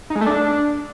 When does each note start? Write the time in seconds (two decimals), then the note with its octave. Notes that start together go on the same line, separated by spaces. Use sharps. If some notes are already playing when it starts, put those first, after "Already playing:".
0.10 D#4
0.16 G#3
0.21 A3
0.27 D4